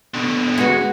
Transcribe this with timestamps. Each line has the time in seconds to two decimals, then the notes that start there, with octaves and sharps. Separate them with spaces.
0.14 B2 D3
0.58 G#3 B3 F#4